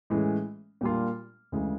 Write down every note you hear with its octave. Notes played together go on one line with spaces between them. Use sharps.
A2 E3 G#3 C#4
A#2 G3 A#3 D4 F4
D2 C#3 E3 G#3